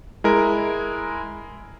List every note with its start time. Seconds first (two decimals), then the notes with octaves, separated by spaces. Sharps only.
0.24 G#3 E4 A#4